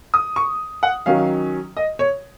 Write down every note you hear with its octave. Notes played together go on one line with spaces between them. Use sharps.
D#6
C#6
F#5
D#3 F#3 C#4 F5
D#5
C#5